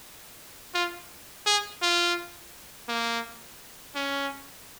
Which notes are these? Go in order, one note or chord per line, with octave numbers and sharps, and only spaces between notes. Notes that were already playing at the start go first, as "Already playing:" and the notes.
F4
G#4
F4
A#3
C#4